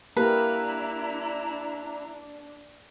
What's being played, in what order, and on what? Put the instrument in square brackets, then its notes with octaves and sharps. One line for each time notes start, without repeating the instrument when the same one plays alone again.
[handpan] A#3 G4 A#4 [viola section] D4 [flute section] E4 A#5 [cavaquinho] B4